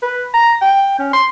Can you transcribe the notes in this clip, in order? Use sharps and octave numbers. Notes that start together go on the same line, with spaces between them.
B4
A#5
G5
C#4
C6